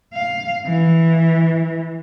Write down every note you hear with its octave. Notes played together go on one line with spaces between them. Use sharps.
F5
E3